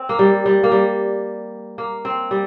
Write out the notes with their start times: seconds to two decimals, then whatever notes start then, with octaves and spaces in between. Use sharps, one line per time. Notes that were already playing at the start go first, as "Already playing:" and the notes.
Already playing: C4
0.09 A#3
0.19 G3
0.46 G3
0.64 A#3
0.72 G3
1.78 A#3
2.05 C4
2.31 G3